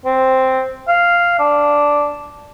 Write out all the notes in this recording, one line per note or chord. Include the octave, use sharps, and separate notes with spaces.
C4
F5
D4